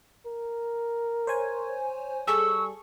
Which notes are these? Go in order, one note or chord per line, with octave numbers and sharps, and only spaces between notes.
A#4
C5 C#5 G#5
G3 G#4 A4 C#6 E6